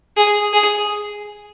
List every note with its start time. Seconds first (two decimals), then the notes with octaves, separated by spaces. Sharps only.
0.17 G#4
0.53 G#4